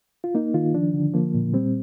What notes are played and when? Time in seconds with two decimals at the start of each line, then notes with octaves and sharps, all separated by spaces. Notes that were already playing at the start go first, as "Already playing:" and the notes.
0.24 F4
0.35 A#3 D#4
0.54 D#3 F4
0.75 F3 D4
0.94 D3
1.14 F3 A#3
1.34 A#2
1.53 G3 C4